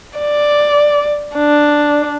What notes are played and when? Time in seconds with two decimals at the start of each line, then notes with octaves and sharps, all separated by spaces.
0.18 D5
1.36 D4